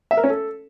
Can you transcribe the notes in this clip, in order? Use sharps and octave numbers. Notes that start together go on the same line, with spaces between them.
E5
A#4
C#4
A4